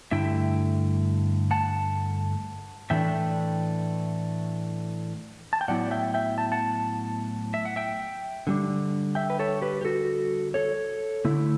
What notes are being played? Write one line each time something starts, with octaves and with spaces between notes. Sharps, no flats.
G2 D3 A3 E4 E5 G5
F#5 A5
A2 E3 A3 D4 E5 G5
A5
G5
A2 F#3 B3 E4 D5 F#5
E5 G5
E5 G5
A5
F#5 A5
E5
F#5
E5 G5
D3 G3 D4
E5 G5
B4
A4 C#5
G4 B4
G4
F#4 A4
A4 C#5
D3 A3 E4